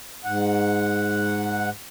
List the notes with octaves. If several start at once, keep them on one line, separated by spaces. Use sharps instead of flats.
G#2 F#5